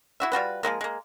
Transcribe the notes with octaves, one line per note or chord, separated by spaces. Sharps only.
E4 F#4 E5
G3 F4 F#4 B4
F3 F#3 G#3 A#3
G#3 A#3